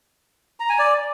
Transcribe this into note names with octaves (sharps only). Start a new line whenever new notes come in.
A#5
G#5
D5